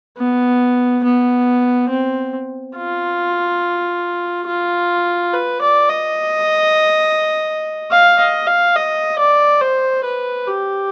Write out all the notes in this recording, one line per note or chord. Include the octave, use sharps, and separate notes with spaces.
B3
B3
C4
F4
F4
B4
D5
D#5
F5
D#5
F5
D#5
D5
C5
B4
G4